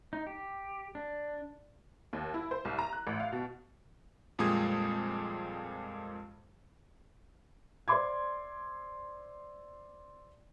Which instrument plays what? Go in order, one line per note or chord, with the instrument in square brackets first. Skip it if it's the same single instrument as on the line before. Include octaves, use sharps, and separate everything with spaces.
[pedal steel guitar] D#4
G4
D4
[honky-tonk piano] D#2
E4
C5
C2
A#5
F#6
A1
F5
B2
[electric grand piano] F2 A#2 G3 G#3 D#6 G#6
[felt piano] C5 D5 E5 C6 D6 G#6